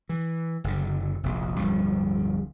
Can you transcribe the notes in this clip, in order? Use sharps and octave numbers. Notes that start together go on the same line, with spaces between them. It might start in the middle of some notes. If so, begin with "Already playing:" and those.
E3
F#1 D3
F1 A#1
D1 G2 F3